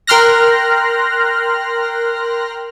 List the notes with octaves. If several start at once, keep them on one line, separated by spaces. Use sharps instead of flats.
A#4 G5 C6 F6 F#6 A#6